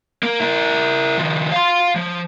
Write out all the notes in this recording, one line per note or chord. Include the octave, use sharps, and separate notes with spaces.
A#3
E4 A#4
D#3 F3
F5 C6
F3